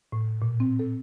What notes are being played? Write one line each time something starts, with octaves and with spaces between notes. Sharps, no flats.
A2
A#2
C4
A4